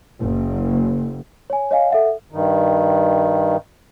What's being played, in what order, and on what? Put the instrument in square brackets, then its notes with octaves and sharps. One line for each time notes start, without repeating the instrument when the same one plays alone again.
[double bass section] F#1
[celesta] C#5 G#5
C#5 D#5 F5 G#5
A4 E5 F#5
[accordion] G2 D#3